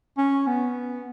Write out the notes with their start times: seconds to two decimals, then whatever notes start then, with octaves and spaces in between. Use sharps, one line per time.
0.17 C#4
0.47 B3